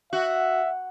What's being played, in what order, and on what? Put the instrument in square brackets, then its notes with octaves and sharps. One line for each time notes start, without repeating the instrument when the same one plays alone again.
[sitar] F#4 [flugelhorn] E5